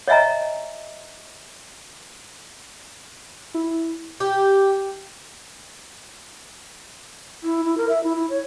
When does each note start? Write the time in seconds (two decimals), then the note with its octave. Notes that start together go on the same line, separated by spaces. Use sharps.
0.08 C#5 D#5 E5 G#5 A#5
3.54 E4
4.20 G4
7.43 E4
7.65 E4
7.77 A#4
7.89 E5
8.04 E4
8.16 E4
8.30 C#5